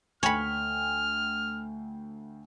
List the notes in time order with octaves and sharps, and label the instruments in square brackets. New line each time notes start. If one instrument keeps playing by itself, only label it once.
[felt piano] D2 G5 G#5 [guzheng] C#5 B5 [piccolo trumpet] F6